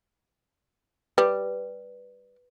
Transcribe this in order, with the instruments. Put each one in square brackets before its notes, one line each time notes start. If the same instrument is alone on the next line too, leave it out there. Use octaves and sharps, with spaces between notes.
[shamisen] G3 [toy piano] B4